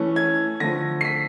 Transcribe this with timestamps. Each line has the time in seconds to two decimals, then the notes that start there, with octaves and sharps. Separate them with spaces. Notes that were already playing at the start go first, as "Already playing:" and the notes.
Already playing: E3 A3 C#4
0.16 G#6
0.60 D3 F3 A3 A#6
1.01 C7
1.05 B6